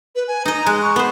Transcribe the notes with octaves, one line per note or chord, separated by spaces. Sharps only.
B4
G#5
D#4 D#5 A#5
G#3 F#6
C#6
B3 C5